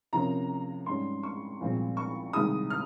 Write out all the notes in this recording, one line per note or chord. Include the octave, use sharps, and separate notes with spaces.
C3 F3 A#3 C#4 A#5
G#2 G3 C#4 C6
C#6
C2 A#2 F3 G#3 C4
C#6
C2 C3 D#3 G#3 D#6
F6